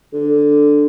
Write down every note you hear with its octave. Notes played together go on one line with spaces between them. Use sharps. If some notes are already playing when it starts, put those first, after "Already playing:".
D3